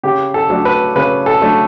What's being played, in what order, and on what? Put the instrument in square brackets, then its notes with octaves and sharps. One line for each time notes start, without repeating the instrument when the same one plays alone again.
[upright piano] C#3 G4
A4
F#3 A3 D4
B4
C#3 B4
A4
F#3 A3 D4